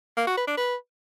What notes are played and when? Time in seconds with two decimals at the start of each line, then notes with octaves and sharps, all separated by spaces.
0.17 A#3
0.27 F#4
0.37 B4
0.47 D4
0.57 B4